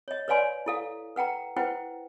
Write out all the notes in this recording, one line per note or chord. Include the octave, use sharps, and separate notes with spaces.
C#5 D#5
B4 C#5 D5 F5 G#5 C6
E4 A4 F5
B4 F#5 G5 A#5
E4 B4 C5 F#5 G5